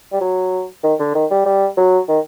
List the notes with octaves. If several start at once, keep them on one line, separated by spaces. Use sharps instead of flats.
G3
F#3
D#3
D3
D#3
G3
G3
F#3
D#3